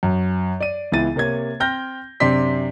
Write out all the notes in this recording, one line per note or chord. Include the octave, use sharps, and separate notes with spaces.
F#2
D5 D#7
C#2 E3 B3 E4 A6 D#7
C3 A#3 C#5 G#6
C4 G5 F6 G6 A#6
F#2 C3 C4 D4 C6 B6